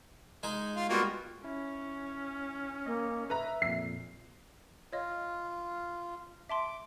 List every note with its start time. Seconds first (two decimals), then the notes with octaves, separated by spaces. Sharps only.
0.43 G#3 D#4 G#4
0.76 F4
0.89 G3 A#3 B3 F4 F#4
1.44 C#4 E4
2.86 A#3 D#5
3.30 B4 E5 A#5
3.62 F2 A#2 C7
4.92 F4 C#5 D#5
6.49 E5 A5 C6 D6